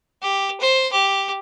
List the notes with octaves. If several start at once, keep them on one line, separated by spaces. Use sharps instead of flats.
G4
C5
G4